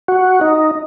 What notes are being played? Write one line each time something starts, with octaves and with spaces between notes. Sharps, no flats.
F#4
D#4